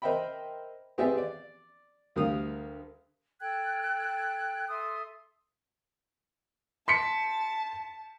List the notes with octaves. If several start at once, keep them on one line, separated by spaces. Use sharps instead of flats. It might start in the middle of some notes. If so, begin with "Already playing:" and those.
A#4 C5 D#5 E5 G5 B5
B3 C4 G4 G#4 D5 E5
D5
D2 G3 A#4 F5 D#6
A4 G5 F#6 G#6
A4 E5 C6 D#6
A5 C6 B6 C#7